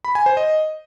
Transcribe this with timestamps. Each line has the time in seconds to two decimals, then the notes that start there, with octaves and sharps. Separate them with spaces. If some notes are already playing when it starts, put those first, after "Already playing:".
0.05 B5
0.15 G#5
0.26 C5
0.37 D#5